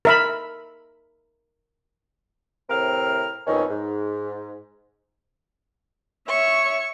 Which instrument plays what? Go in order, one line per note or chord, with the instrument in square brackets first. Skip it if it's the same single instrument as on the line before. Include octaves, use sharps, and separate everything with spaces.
[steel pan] A#4 E5 B5
[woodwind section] A2 C3 C4 A#4 F6
F2 B2 D#3 C#4 D#4
G#2
[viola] C#5 E5 [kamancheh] C#6